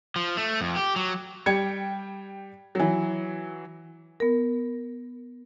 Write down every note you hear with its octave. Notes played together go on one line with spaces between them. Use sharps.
F3
A3
F2
G4
F#3
G3 G5 G#6 C#7
E3 F#3
B3 A#4